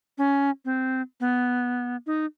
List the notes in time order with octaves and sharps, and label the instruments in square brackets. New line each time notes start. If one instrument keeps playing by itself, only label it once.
[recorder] C#4
C4
B3
D#4